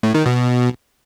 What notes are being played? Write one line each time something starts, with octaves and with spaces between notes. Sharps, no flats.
A2
D#3
B2